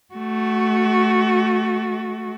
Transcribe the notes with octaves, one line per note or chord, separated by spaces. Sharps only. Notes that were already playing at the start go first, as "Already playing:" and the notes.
A3 F#4